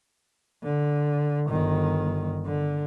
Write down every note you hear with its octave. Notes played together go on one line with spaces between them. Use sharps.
D3
G1 D#3
D3